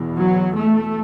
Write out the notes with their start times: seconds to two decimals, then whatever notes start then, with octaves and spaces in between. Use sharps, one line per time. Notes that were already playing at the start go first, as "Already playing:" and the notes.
Already playing: E2 B2
0.17 F#3
0.56 A3